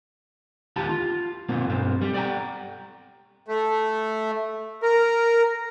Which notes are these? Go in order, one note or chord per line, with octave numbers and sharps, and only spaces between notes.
D#2 F4 G4 A5 B5
F4
B2 A#3 C4
B1 G2 C4
G3
D5 G5 A#5
A3
A#4